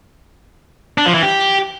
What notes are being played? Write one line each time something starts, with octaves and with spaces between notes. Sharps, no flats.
D4
F3
E3
G4